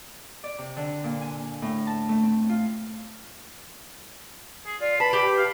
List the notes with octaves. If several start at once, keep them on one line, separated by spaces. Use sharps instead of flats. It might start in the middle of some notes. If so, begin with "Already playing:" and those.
D5
C3
D3
A#2
G#5
A2
A5
A3
C4
F4
G#4
F4 D5
B4 A5 B5
G4
F5